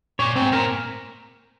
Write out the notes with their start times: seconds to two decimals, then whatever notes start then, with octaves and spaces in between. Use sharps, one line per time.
0.19 A#2 C#5
0.35 G#2 C4
0.52 A#2 A#4